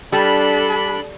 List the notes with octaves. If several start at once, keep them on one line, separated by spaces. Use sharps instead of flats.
G3 D4 A4 B5